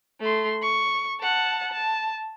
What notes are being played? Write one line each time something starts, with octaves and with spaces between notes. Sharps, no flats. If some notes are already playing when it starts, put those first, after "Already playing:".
A3 C6
C#6
F#5 A5
A5